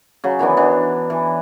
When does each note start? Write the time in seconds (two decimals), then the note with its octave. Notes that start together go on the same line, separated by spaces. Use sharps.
0.24 C#3 F#3
0.39 D#3 E3 B3 D4
0.57 E3 D4
1.10 E3